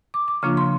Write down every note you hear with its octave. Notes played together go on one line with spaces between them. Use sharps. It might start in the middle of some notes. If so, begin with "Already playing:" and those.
D6
D6
C#3 F3 A#3 D4 F4 C#6
C6